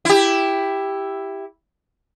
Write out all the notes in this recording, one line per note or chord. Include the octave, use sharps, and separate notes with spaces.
E4 G4